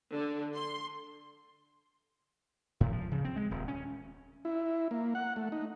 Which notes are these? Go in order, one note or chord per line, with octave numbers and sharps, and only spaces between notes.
D3
C6
A2
F3
C#3
C4
G#3
D#1
C#4
E4
A#3
F#5
A3
D#4